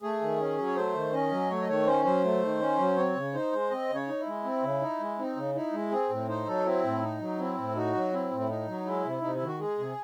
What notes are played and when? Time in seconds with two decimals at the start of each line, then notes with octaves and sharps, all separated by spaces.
0.02 A3 G#4
0.21 D#3
0.39 C#4
0.58 F#3
0.66 C#5
0.76 A3 C5
0.95 D#3
1.13 C#4 D#5
1.31 F#3
1.50 A3 C#5
1.62 D#5
1.68 D#3 C#5
1.86 C#4 C5
2.05 F#3 C5
2.24 A3
2.42 D#3
2.60 C#4
2.78 F#3
2.97 C4 C#5
3.16 C#3
3.34 D#4 C5
3.52 G#3
3.70 C4 D#5
3.89 C#3
3.95 C#5
4.08 D#4
4.20 E4
4.27 G#3
4.44 C4
4.63 C#3
4.81 D#4
5.00 G#3
5.18 C4 D#4
5.36 C#3
5.55 D#4 E4
5.73 G#3
5.91 C4 G#4
6.10 A2
6.28 D#4 C5
6.47 F#3 A4
6.66 C4 E4
6.84 A2
7.02 D#4
7.20 F#3
7.39 C4 E4
7.58 A2
7.75 D#4 F#4
7.95 F#3
8.13 C4 E4
8.31 A2
8.40 E4
8.49 D#4
8.68 F#3
8.86 G#3 E4
9.05 C3
9.22 C3 D#4
9.35 E4
9.41 D#3
9.47 F#4
9.60 G#3 G#4
9.78 C3